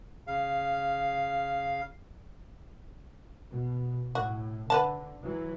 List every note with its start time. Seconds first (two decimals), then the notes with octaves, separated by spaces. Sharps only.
0.27 C#3 F5
3.51 B2
4.15 A2 F#4
4.70 D3 B4 F#5 A5
5.23 E3 F#3